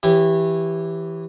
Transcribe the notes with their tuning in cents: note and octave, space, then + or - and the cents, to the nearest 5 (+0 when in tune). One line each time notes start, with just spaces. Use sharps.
E3 +0 G4 +0 C#5 -25